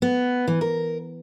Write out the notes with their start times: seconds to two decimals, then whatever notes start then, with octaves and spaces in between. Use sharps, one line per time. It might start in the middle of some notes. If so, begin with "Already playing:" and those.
0.02 B3
0.48 E3
0.61 A#4